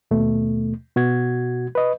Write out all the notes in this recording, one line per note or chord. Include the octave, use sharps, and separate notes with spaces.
D#2 B2 A3
B2 F#4 G#6
B4 D#5